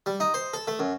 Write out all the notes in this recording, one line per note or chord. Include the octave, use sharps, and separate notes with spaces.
G3
D#4
C5
A4
A3
F#2